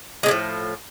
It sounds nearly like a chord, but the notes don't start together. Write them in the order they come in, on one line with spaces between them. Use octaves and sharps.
G#3 C3 A2 F3